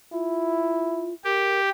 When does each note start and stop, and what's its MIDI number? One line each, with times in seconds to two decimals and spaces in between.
0.13 1.16 64
0.13 1.13 65
1.24 1.70 67
1.24 1.60 70